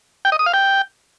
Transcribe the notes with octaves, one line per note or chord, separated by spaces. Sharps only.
G5
D#5
D#6
F5
G5